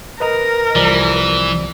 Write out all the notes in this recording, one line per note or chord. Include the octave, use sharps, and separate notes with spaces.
A#4 B4 D#5 A#5
C2 E3 F3 D5